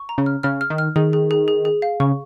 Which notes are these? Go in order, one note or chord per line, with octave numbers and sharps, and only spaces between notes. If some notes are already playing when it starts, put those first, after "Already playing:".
Already playing: C#6
A#5
C#3
F6
C#3 F6
F6
D#3
F6
D#3 G#4
G#4
G#4
G#4
G#4
F5
C#3 C#6